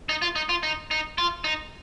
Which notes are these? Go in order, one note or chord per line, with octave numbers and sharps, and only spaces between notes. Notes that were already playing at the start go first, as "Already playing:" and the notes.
D#4
F4
D#4
F4
D#4
D#4
F4
D#4